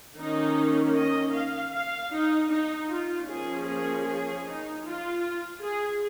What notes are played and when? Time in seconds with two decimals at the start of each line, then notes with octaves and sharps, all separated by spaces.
0.17 D#3 A#3 C#4 D#4
0.95 D#5
1.33 F5
1.72 F5
2.11 D#4
2.49 D#4
2.89 F4
3.27 F3 A#3 C#4 G#4
3.66 G#4
4.05 G#4
4.45 D#4
4.84 F4
5.61 G#4